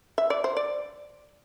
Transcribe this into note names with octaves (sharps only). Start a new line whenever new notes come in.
E5
D5
C5
D5